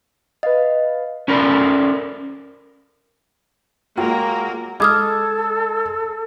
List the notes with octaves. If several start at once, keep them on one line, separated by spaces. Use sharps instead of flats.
B4 D#5 F5
C#4 A4 A#4 C5 D5 B5
F#3 G#3 A#3 F4 A#4 G5
G#3 A4 D6 D#6 F6 G#6